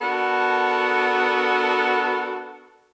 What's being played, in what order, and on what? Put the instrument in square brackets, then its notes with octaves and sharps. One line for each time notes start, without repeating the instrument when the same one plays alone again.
[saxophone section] B3 D4 F#4 A4 A#4